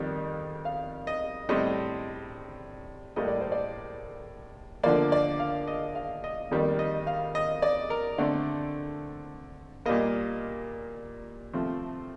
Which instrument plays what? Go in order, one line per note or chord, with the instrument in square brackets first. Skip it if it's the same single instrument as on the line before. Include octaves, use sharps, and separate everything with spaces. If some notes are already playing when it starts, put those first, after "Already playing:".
Already playing: [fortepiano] F2 D#3 G3
F5
D#5
A2 G3 C4 D#5
A2 G3 A#3 D#5
D5
C5
D5
D3 F3 A#3 D5
D5
F5
D#5
F5
D#5
F2 D#3 G3 A#3
D#5
F5
D#5
D5
A#4
D3 A3 C4 D5
A#2 G3 A#3 D#5
C3 F3 A3 C4